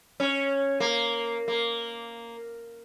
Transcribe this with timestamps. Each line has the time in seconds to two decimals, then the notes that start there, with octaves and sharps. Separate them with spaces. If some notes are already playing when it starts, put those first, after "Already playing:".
0.20 C#4
0.80 A#3
1.48 A#3